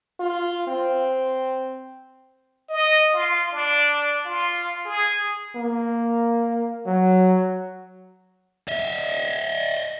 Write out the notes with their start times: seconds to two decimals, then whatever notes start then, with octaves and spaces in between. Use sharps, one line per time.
0.20 F4
0.67 C4
2.69 D#5
3.13 F4
3.53 D4
4.25 F4
4.86 G#4
5.56 A#3
6.87 F#3
8.68 D#5 E5